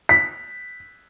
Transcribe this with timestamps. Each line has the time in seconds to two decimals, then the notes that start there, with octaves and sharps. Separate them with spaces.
0.09 B6